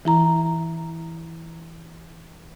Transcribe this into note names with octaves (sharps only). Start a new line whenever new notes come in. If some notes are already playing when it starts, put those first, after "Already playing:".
E3 E4 A#5